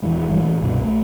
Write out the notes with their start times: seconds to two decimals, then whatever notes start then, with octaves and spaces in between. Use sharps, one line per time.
0.02 D#1 E2 E3 G#3
0.28 G1 E3 G3
0.42 A2 E3 F3 G#3
0.61 C2 G2 B2
0.84 A#1 A3